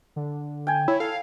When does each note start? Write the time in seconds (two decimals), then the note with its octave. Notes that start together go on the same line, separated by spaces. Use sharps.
0.16 D3
0.67 G5 G#5
0.88 E4 C#5
1.00 A4 F5